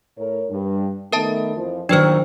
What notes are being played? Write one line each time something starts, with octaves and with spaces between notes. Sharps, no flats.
A2 A#4 C#5
G2
D#3 A3 B3 A#4 E5 A5
F2 E3 F3
E2 A#2 D#3 F#3 D4 B4 C5 D5